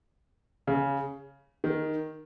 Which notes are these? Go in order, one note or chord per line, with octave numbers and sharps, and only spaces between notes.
C#3
D#3